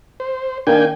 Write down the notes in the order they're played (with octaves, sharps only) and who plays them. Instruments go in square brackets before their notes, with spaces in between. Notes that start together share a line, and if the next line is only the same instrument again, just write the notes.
[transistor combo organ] C5
[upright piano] D#3 A#3 [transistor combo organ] D4 G5 G#5